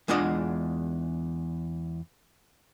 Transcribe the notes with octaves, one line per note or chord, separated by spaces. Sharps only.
E2 G#3 D4 F4 D#5 F#5